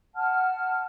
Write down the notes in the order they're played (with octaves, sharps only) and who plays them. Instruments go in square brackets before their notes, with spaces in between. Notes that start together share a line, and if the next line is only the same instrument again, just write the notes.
[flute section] F#5 A5 F6